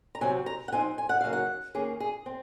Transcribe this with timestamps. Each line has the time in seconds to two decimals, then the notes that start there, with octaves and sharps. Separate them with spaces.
0.15 A#5
0.21 C3 F#3 C4 G#5
0.46 A#5
0.68 F#5
0.72 F3 C4 D#4 G#5
0.98 G#5
1.09 F#5
1.21 C#3 F#3 A#3 D#4 F5
1.33 F#5
1.75 D#3 A#3 C#4 G#4
2.00 G#4
2.26 C4